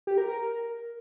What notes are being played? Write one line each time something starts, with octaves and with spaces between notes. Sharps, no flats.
G4
A#4
A#4